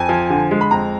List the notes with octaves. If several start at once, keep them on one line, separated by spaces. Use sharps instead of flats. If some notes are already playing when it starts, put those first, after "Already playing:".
Already playing: F2 G#5
F3
D3
G#3
B5
F2 A#5